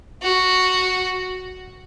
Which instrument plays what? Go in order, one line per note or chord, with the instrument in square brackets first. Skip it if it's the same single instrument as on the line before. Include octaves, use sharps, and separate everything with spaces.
[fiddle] F#4